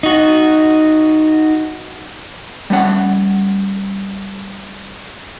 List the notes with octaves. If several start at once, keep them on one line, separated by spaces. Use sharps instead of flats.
D#4 F#4
G3 A3 C#4 F#5